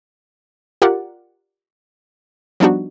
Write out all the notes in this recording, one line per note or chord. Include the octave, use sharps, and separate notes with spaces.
F4 G4 A#4 D5 F#5
F3 G3 B3 D4 D#4 F#4